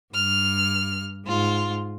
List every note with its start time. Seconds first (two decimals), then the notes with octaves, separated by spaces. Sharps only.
0.13 G2 F6
1.25 G#2 F4